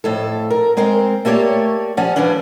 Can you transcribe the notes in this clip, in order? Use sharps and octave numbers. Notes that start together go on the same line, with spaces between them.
F2 A2 A4
A#4
G#3 C4 A#4 C5
A3 A#3 G4 C#5 D5
F3 C#4 D5 F#5
E3 F3 G3 C#4 D4